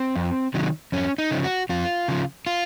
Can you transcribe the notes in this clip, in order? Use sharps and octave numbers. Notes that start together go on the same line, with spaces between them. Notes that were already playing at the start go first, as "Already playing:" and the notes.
Already playing: C4
F2
C3 D#3 F#3
F2 C#4
D#4
C#3 F3
F#4
F2 F4
C#3 F3
F4